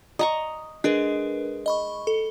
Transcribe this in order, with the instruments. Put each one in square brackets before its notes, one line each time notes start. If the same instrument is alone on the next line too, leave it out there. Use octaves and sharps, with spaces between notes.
[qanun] D#5 A#5 C#6
[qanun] G#3 [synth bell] D4 A#4 B4
[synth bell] D#5 B5 C#6
A4